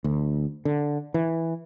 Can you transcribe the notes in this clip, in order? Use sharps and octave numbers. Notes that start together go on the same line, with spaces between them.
D2
D3
E3